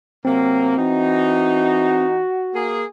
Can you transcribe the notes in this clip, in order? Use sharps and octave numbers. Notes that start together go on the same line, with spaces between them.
C3 F#3 A#3 C4
E3 D#4 F#4
A#3 G#4